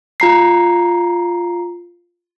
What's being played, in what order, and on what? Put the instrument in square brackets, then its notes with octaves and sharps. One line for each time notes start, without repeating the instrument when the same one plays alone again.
[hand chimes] F4 A#5 C7